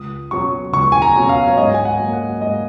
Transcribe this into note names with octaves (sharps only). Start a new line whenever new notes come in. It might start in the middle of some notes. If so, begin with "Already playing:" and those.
Already playing: C#2 D#6
B2 F#3 C#4 C#6
C#2 C#6
G#5
A#5
B2 F#3 C#4
F5
C#5
G#2 D#5
G#5
F#5
F#3 A#3
F#5
G#2 D#5